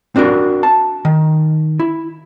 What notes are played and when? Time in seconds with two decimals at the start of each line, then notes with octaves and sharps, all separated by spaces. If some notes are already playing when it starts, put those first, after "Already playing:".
0.16 C4 D4 F#4 A#4
0.63 A5
1.05 D#3
1.79 E4